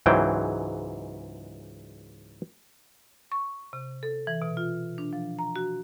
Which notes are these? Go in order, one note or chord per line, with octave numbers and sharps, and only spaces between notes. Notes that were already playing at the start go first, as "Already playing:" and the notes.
C#2 G#2 E3 F#3 C5 G5
C#6
C3
A4
E3
B2
F4
D4
F3
A#5
F#4